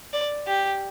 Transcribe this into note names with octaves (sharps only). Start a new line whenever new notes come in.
D5
G4